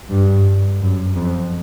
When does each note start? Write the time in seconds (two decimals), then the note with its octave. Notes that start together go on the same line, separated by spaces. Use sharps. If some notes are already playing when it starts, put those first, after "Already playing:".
0.10 G2
0.81 F#2
1.15 F2